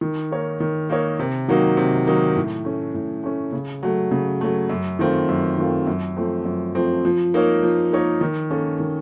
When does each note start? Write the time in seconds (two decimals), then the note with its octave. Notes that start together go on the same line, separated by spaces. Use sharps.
0.01 D#3
0.31 A#3 D#4 A#4 C#5
0.60 D#3
0.90 A#3 D#4 A#4 C#5
1.19 C3
1.48 D#3 F#3 A#3 D#4
1.77 C3
2.07 D#3 F#3 A#3 D#4
2.36 A2
2.65 A3 C#4
2.95 A2
3.23 A3 C#4
3.53 C#3
3.83 F#3 A3
4.11 C#3
4.41 F#3 A3
4.69 F#2
4.99 D#3 A3 C4 F4
5.29 F#2
5.58 D#3 A3 C4 F4
5.87 F#2
6.17 F3 A3 C4
6.45 F#2
6.75 F3 A3 C4
7.05 F3
7.34 A#3 D#4 A#4 C#5
7.63 F3
7.92 A#3 D#4 A#4 C#5
8.21 D#3
8.51 A#3 C#4 A4
8.80 D#3